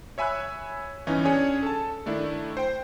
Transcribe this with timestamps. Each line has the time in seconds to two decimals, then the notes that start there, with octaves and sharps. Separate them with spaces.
0.18 C#5 E5 G#5 B5 E6 F#6
1.07 G1 E3 C#4 D#4
1.24 C#4 D4 G#4 C#5 G#5
1.63 A4 A5
2.06 D#3 A3 D4 E4
2.57 C5 G5